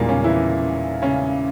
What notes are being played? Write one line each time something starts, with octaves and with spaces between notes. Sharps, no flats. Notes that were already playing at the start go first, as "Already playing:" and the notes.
Already playing: E1 E2 A#2 D#3 G3 G#3 A#3
C#3 C#4
E3 E4
C#3 C#4